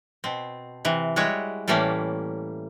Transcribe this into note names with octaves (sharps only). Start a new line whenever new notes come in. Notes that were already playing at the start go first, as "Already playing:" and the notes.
B2 C4
C3 E3
G3 G#3 E4 F#4 C#5
A2 E3 G3 A3 A#3 C#4